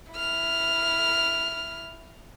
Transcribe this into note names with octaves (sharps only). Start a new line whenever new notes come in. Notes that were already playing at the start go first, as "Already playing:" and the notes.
E4 F6